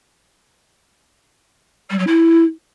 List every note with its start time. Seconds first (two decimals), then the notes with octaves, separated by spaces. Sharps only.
1.90 G3
1.98 F#3
2.07 E4